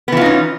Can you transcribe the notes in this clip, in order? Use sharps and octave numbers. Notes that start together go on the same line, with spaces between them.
E3 B3 C#4 D#4 F4